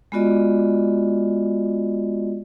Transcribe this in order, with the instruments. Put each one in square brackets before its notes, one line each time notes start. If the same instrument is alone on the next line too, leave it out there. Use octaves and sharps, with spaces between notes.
[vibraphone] G#3 B3 F4 F#4 D5 D#5